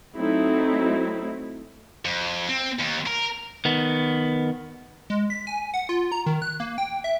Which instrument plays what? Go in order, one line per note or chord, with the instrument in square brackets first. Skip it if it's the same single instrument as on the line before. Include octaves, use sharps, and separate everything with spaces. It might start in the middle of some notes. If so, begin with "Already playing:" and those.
[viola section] F#3 A3 C4 D#4 E4
[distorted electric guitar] F2
C4
D#2
A#4
[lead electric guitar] D#3 B3
[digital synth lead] G#3
B6
G#5
F#5
F4
A#5
D#3
F#6
A#3
G5
E5